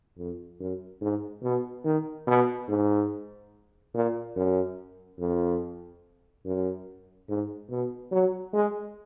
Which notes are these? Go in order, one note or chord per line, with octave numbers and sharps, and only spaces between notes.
F2
F#2
G#2
B2
D#3
B2
G#2
A#2
F#2
F2
F#2
G#2
B2
F#3
G#3